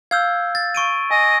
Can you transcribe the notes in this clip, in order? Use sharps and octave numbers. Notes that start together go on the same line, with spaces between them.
F5 E6 F6 G6 G#6
A6
C#6 D7 D#7
D#5 G#5